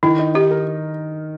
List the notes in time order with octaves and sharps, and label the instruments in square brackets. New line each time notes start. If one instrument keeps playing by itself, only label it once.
[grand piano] D#3 [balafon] E4
[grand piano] D#4
[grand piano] D#4 [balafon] G4
[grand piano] A#4